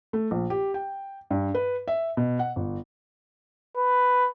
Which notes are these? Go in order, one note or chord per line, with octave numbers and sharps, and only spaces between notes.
A3
A#1
G4
G5
G2
B4
E5
B2
F#5
G1
B4